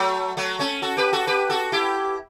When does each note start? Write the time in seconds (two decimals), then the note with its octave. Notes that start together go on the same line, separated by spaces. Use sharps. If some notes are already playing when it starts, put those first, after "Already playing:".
Already playing: F#3 A3
0.37 F#3 A3
0.59 A3 C#4
0.82 F#4 A4
0.97 G4 B4
1.13 F#4 A4
1.27 G4 B4
1.50 F#4 A4
1.72 E4 G4